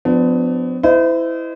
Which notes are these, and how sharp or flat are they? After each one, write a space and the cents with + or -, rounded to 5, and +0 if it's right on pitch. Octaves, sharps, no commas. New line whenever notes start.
F3 +20 B3 +35 D4 +5
E4 +0 C5 -40 D#5 -10